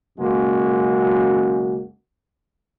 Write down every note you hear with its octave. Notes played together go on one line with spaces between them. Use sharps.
B1 F#2 C#3 G#3 A#3 F#4